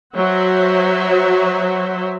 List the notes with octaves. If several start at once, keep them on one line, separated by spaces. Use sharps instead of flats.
F#3 F#4 C5 E5